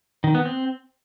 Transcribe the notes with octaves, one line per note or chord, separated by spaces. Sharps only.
D#3
B3
C4